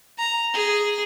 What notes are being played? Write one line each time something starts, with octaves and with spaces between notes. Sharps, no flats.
A#5
G#4